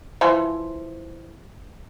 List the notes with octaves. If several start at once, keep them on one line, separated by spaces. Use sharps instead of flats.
E3 F3 C5